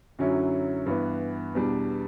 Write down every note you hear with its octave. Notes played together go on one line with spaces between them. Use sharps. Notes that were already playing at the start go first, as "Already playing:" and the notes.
F#2 D3 F#3 C#4 E4
G2 E3 B3
E2 B2 G3 D4